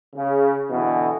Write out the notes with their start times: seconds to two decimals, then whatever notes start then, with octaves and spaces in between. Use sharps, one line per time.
0.16 C#3
0.71 B2 D3 E3